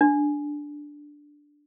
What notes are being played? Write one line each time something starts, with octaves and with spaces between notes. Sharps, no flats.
D4